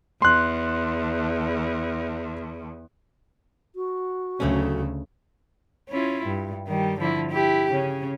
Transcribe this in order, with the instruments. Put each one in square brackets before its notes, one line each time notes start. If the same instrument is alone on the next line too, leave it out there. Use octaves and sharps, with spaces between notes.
[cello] E2 [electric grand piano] C6 F#6
[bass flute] F#4
[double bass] D2 C#3 [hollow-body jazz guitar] F#3 A3 C#4
[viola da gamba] C#4 E4 F4
G2
D#3 G3
D3 F3 E4
E4 G4
C#3 C#4